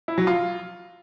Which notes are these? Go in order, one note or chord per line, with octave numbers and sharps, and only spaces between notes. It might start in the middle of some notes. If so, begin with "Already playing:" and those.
E4
F#3
F4